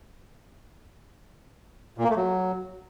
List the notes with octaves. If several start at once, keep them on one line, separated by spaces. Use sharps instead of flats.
A#2
A#3
A3
F#3